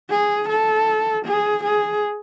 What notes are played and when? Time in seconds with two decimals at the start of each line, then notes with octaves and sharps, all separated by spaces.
0.10 G#4
0.49 A4
1.25 G#4
1.64 G#4